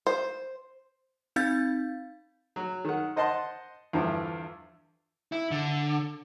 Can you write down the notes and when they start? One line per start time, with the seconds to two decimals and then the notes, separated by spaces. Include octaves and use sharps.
0.07 C5
1.36 C4 D#4 F5 G6 A6
2.56 F#3
2.85 D#3 F#5
3.16 C5 D#5 F#5 A5 C6
3.93 E2 G2 D3 E3 F3
5.32 E4
5.51 D3